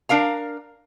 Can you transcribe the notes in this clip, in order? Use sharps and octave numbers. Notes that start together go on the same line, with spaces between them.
D4 A#4 F5 A#5